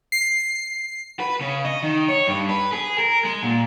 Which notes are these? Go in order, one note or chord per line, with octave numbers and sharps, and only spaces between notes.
C7
B4
C#3
D#5
D#3
C#5
G2
B4
G#4
A#4
G#3
A#2